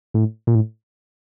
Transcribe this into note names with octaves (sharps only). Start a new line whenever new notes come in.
A2
A#2
A2